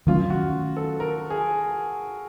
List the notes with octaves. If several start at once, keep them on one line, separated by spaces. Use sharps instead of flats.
D#3 F#3 A3 C#4 F4
F#4
A4
A#4
G#4